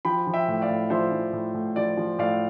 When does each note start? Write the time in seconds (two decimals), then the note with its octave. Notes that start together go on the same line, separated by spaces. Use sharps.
0.05 F3 G5 B5
0.27 F3
0.34 E5 G5
0.48 A2
0.62 D5 F5
0.70 A2
0.90 F3 C5 E5
1.12 F3
1.33 A2
1.54 A2
1.76 F3 D5
1.97 F3
2.19 A2 D5 F5